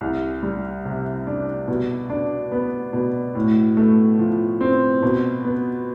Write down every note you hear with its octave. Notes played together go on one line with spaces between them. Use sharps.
C2
G3
C3
D4
B2
D4
B3
B2
A2
A3
F3
C4
B2
B3